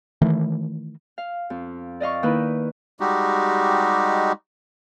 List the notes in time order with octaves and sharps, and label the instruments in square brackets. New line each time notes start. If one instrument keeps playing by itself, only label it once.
[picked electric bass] D#3 E3 A3
[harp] F5
F2
D5 D#5 F5 C#6
D#3 A#3 D#4 E4 B4
[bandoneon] G3 G#3 D#4 F#4 G4